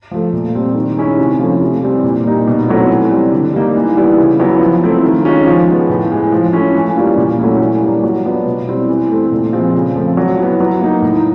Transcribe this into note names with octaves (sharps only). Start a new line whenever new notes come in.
F3 A3
A#2
G3 C4
D#3
G#3 C#4 E4
C3
F3 A3 C#4 E4
C3
E3 G3 C4
A#2
G3 A#3 D#4
B2
F#3 A3 C4 E4
E3
G3 C4
D3
G3 A#3 D#4
E3
G3 B3 E4
C#3
F#3 B3 E4
F3
A3 C4 E4
D#3
G#3 C#4 F4
F3
G#3 B3
A2
E3 G#3
F3
A3 C#4 E4
E3
G3 A#3 C#4 F4
A#2
F#3 A3 C#4 E4
E3
G3 A#3 D4
F#3
B3 D4 F4
B2
G3 C4 E4
E3
A3 C4
A#2
F3 G#3 C4 F4
C#3
F3 A3 C4
F#3
B3 E4
F#3
A#3 D#4
A2